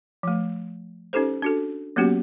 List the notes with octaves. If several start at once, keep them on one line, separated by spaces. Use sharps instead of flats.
F3 A3
C#4 D#4 G4 A4 C5
D4 F#4 A4
F#3 A#3 B3 C#4 F#4 G4